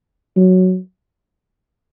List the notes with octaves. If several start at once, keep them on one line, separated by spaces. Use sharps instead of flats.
F#3